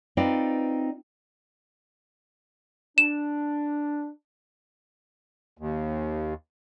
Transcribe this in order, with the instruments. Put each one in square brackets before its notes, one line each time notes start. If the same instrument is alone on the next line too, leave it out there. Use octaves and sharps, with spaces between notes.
[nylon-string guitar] C4 D#4 F4 B4 D5
[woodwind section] D4 [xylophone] E7
[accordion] D#2